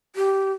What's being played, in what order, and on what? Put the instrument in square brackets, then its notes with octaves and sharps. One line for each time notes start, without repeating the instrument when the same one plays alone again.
[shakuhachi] G4